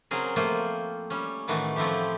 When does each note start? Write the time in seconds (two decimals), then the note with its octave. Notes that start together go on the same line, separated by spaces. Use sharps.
0.11 C#3 F#3 C4 G#4 A#4
0.36 F3 A3 A#3 F4 C5 G#5
1.10 G3 C#4
1.48 A2 D#3 E3 A3 F#4
1.76 F3 A3 C4 E4 G4